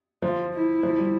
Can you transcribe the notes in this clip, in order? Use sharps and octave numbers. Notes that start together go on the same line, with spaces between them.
F3 F4
E4
F3
G3